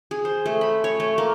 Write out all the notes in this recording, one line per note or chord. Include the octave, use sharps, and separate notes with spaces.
G#4
C5
A3
B5
C#5
A3
A#3